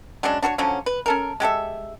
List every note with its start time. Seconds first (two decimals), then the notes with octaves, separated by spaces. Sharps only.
0.23 F#3 G#3 C#4 D4
0.42 D4 F#4 A#4 C#5
0.58 D3 F3 F#3 C#4
0.86 B4
1.06 C#4 A4 A#4
1.40 G#3 G4 A4 E5